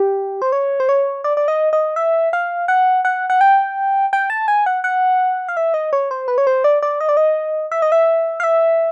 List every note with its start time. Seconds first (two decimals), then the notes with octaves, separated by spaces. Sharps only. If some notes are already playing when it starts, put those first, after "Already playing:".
Already playing: G4
0.42 C5
0.52 C#5
0.80 C5
0.89 C#5
1.24 D5
1.37 D5
1.48 D#5
1.73 D#5
1.96 E5
2.33 F5
2.68 F#5
3.05 F#5
3.30 F#5
3.41 G5
4.13 G5
4.30 A5
4.48 G#5
4.66 F#5
4.84 F#5
5.49 F5
5.57 E5
5.74 D#5
5.93 C#5
6.11 C5
6.28 B4
6.38 C#5
6.47 C5
6.64 D5
6.83 D5
7.01 D#5
7.09 D5
7.17 D#5
7.72 E5
7.82 D#5
7.92 E5
8.40 F5
8.44 E5